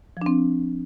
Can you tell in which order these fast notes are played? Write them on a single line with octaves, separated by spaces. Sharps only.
F3 D4 C4